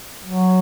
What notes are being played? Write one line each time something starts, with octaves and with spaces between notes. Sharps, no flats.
F#3